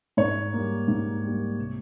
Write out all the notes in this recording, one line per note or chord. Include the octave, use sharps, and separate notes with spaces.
G#2 C#5
G3 A#3
G#2
G3 A#3
C3